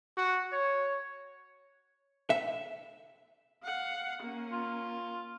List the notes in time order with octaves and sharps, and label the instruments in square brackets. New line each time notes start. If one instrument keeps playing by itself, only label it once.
[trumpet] F#4
C#5
[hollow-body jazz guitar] E5
[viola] F5 F#5
A#3 C#4
[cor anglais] F4